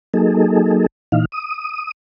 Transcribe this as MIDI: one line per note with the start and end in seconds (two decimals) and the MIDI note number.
0.14 0.86 54
0.14 0.86 58
0.14 0.86 63
0.14 0.86 68
0.14 0.86 69
1.12 1.25 46
1.12 1.25 52
1.12 1.25 63
1.12 1.25 77
1.32 1.91 87